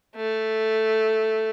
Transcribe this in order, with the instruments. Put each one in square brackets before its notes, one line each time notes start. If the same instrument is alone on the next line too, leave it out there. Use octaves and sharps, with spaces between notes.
[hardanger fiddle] A3